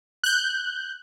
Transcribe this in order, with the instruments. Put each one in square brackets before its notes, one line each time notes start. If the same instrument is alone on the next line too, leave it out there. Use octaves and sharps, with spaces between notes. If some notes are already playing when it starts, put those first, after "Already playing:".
[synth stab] F#6 G6